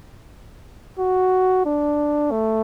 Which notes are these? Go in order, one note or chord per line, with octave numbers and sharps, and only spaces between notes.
F#4
D4
A3